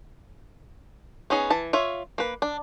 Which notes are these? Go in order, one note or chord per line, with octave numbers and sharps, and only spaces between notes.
B3 C#4 D#4 G#4
E3 A5
F4 C#5 E5
A#3 B4
D4